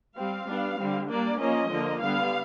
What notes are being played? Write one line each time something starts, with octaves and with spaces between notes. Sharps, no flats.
G3 C4 F5
G3 B3 D4
D3 G3 C4
G3 A#3 D4 D5
F3 A#3 C#4 D#5
D3 F3 A#3
D3 G3 B3 F5